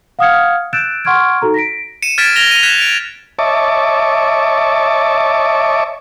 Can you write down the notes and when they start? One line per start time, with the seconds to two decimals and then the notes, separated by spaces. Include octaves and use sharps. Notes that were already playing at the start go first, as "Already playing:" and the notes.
0.19 F5 F#5 D#6 F6 G#6 C#7
0.73 E6 F#6 G6 A6 D7 E7
1.05 F#5 C6 C#6 F6 G#6 D7
1.42 D#4 F#4 A4 A#5
1.54 A#6 B6 D7
2.02 C#7 D#7 E7
2.18 F6 G#6 A6 B6 D7 E7
2.36 G#6 A#6 F7 G7
2.51 D#7 F7
2.63 F#6 G#6 B6 E7
2.78 D7 F7
3.39 C#5 D#5 E5 A5 C#6 D6